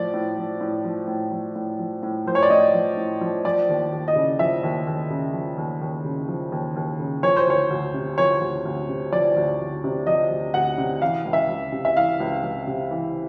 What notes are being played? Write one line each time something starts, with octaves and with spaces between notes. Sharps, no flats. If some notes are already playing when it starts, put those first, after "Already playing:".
Already playing: A2 F3 D5
A2
F3
A2
F3
A2
F3
A2
F3
A2
F3 C5
C#5
D5
A2 D#5
F3
A2
F3
F3 D5
D#2
D#2
D#5
C#3
F3 E5
D#2
D#2
C#3
F3
D#2
D#2
C#3
F3
D#2
D#2
C#3
F3 C#5
C5
D2 C#5
D2
C3
F3 C#5
D2
D2
C3
F3 D5
D2
D2
C3
F3 D#5
D2
D2 F#5
C3
E3 F5
C#2
E5
C#2
C3
E5
E3 F5
C#2
C#2
C3
E3